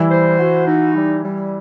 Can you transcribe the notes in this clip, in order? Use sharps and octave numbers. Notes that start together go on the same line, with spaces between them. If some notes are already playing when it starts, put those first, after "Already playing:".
Already playing: E3 G3 E4
C5
F#4
D#4
G3
G3